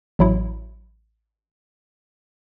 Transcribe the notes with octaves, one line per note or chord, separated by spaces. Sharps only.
A1 F#3 E4